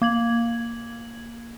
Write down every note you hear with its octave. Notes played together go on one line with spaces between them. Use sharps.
A#3 G#6 F#7